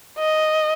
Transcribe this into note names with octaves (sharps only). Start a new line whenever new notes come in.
D#5